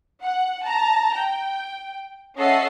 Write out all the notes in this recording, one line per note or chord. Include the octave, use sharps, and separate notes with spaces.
F#5
A5 A#5 A#6
G5
C#4 A4 D#5 E5 F#5 C7